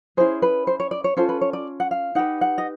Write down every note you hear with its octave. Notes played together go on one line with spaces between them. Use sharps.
C#4 E4 G#4 C5
B4
C5
C#5
D5
C#5
C#4 F4 A4 C5
B4
C#5
D5
F#5
F5
D#4 G4 B4 F#5
F#5
D#5